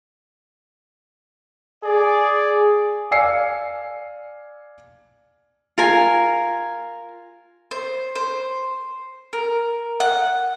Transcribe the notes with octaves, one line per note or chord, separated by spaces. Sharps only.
G#4 D5
D5 F5 G#5 E6 C7 C#7
F4 A#4 G#5
C5
C5
A#4
F#5